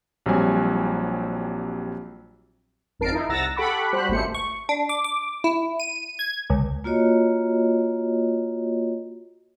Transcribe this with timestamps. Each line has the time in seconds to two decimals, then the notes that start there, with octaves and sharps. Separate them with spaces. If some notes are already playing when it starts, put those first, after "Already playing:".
0.26 A#1 F#3 G3 C4 G#5
2.99 G#1 F2 A#4 A5 C7 D7
3.12 D#4 E4
3.29 C2 F#5 A#5 E6 A6 A#6
3.56 G4 A4 F#5 B5 C#6 D6
3.93 G3 F#4 C5 B5 F#6
4.09 G#1 C#2 C3 A3 C5 C#7
4.34 C#6
4.69 D4
4.89 D6
5.04 D6
5.44 E4
5.80 D#7
6.19 G#6
6.50 C#2
6.84 A#3 F4 F#4 C#5 D#5